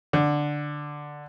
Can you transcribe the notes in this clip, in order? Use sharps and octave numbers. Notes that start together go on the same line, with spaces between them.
D3